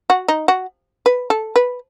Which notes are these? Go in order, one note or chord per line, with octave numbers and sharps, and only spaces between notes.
F#4
D#4
F#4
B4
A4
B4